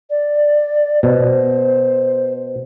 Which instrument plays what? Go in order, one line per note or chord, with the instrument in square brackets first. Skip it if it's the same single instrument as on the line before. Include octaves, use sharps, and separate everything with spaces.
[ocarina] D5
[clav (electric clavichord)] B2 [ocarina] C5